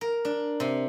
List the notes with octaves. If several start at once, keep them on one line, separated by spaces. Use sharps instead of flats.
A#4
D4
C3